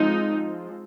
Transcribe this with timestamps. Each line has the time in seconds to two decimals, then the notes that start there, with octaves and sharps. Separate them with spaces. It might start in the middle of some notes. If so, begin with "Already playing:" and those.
Already playing: F3 G#3 C4 D#4